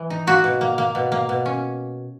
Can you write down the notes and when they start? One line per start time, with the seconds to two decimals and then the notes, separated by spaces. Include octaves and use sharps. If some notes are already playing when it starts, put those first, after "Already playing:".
Already playing: E3
0.10 D#4
0.27 A#3 F#4
0.44 B2
0.61 A#3
0.78 A#3
0.95 B2
1.12 A#3
1.29 B2
1.46 C#4